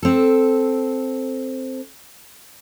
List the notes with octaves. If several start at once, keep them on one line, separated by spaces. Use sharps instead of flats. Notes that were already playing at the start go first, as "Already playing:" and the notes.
C4 A4